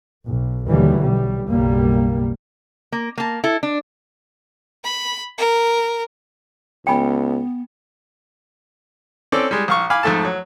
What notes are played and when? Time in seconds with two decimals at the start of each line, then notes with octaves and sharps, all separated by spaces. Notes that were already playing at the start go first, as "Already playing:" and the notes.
0.25 B1
0.69 D#2 B2 D3 E3 F#3 G3
1.00 B1 G3
1.48 F#1 B1 G3 A#3
2.92 A#3
3.18 A#3 A5
3.44 E4 A4
3.63 D4
4.84 B5
5.38 A#4
6.87 C#2 B3 G5 G#5 B5
9.32 C4 C#4 A4 D5
9.51 G3 G#3
9.68 A#1 F5 C#6
9.90 F5 G#5 B5 D6
10.03 F2 G#2 A3 A4 A5
10.25 F#3